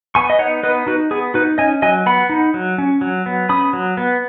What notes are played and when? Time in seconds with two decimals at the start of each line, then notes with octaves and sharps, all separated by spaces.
0.15 B3 G#5 C#6
0.30 D#5
0.39 D#4 C#5 F#5
0.63 B3 B4 D#5
0.87 D#4 F#4 B4
1.11 B3 G#4
1.34 D#4 F#4 B4
1.58 C#4 D#5 G#5
1.82 F#3 D#5 G#5
2.06 B3 F#5 B5
2.30 D#4
2.54 F#3
2.78 C#4
3.01 F#3
3.26 B3
3.49 C#4 B5 D#6
3.73 F#3
3.97 B3